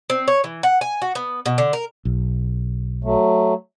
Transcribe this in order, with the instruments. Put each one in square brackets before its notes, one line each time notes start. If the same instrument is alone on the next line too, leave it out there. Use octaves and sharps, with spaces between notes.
[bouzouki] C4
C#5
E3
F#5
G#5
F#4
B3
B2
D3
A#4
[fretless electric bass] B1
[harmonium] F#3 A3